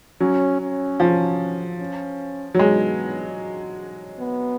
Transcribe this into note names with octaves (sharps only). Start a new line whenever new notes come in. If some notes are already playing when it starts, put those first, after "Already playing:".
F#3 C#4
C#4
F3
C#4
F#3
G#3 B3
B3